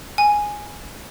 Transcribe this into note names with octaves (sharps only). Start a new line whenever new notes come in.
G#5